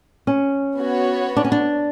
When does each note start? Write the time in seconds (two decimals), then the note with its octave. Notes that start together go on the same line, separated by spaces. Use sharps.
0.27 C#4
0.79 B3 F#4 C#5
1.37 D4
1.45 C#4
1.52 D4